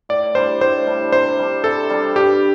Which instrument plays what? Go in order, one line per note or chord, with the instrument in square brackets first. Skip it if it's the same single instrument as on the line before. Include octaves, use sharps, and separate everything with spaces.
[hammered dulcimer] A2 [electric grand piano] D5
[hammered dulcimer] G3 D4 [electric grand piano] C5
[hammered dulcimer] A2 [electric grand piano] C5
[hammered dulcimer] G3 D4
[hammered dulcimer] C3 [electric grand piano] C5
[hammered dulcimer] G3 D4
[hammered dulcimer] C3 [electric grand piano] A4
[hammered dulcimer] G3 D4
[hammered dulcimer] G2 [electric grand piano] G4